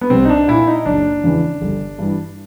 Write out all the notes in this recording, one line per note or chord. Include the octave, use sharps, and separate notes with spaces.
B3
C2 C4
D#4
D4
A#2 E4
D#4
F#1 D4
E2 C#3 E3
G1
G2 E3